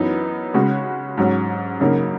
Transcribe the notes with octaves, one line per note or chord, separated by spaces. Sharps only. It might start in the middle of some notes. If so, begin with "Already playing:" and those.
Already playing: F#2 E3 B3 D#4
C#3 G#3 C#4 F#4
G#2 F#3 C#4
F#2 C#3 F#3 A#3 D#4